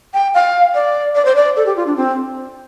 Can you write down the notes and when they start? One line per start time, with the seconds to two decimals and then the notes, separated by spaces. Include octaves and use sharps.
0.14 G5
0.34 F5
0.75 D5
1.15 D5
1.25 C5
1.36 D5
1.56 A4
1.66 G4
1.76 F4
1.86 D4
1.97 C4